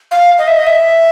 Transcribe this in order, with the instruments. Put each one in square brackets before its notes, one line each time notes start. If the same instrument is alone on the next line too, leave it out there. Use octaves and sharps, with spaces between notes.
[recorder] F5
D#5
E5
D#5
E5